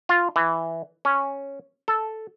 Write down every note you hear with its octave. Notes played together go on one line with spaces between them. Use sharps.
F4
E3
C#4
A4